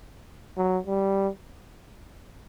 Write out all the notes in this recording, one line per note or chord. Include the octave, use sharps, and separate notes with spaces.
F#3
G3